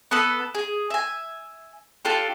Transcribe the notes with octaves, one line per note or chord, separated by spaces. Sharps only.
B3 A4 B4
G#4
E5 G#5
D4 F4 G4 A4